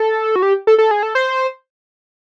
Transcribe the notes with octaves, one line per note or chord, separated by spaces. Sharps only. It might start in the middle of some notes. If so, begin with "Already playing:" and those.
Already playing: A4
F#4
G4
A4
A4
G#4
A4
C5